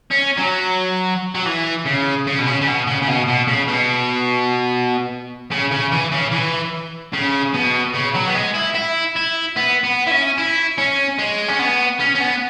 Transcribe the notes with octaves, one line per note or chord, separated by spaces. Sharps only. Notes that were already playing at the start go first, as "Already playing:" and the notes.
C#4
F#3
F#3
E3
C#3
C#3
B2
C#3
C#3
B2
C#3
C#3
B2
B2
C#3
B2
C#3
C#3
E3
C#3
E3
C#3
B2
C#3
F#3
B3
G#3
E4
E4
E4
B3
B3
E4
C#4
E4
C#4
G#3
C#4
B3
C#4
C#4
B3